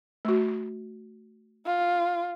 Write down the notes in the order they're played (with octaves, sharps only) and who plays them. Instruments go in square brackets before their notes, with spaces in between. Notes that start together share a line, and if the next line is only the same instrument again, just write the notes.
[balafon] A3 F#4
[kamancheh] F4